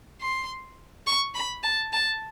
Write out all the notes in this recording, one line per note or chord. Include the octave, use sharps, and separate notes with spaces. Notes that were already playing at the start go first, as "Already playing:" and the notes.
C6
C#6
B5
A5
A5